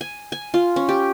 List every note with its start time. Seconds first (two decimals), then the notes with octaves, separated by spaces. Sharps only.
0.01 G#5
0.32 G#5
0.54 F4
0.76 C#4
0.89 G4